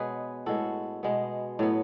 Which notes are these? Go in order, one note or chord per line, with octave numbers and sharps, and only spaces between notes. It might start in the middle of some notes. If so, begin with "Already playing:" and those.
Already playing: B2 G#3 B3 G#4 B4 C#5
A2 G#3 B3 F#4 A4
B2 G#3 B3
A2 F#3 B3